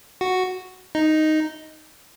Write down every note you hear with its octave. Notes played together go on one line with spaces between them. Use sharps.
F#4
D#4